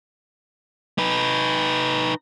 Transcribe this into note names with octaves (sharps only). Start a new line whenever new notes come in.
D#4 B4